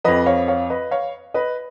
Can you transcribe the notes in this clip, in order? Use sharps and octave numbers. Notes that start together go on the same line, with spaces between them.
F2 F3 B4 D#5
C#5 F5
C#5 F5
B4 D#5
C#5 F5
B4 D#5